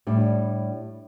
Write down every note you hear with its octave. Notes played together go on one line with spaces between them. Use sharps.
A2 G3 D4